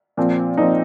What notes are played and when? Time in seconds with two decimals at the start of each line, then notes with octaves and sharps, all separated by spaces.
0.17 A#2 F3 C4
0.57 A#2 F3 C4 D#4